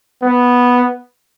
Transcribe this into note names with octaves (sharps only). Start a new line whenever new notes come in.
B3